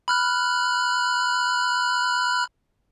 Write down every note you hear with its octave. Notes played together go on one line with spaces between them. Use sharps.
B5 F6 F#6